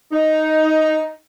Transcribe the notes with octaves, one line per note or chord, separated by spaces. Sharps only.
D#4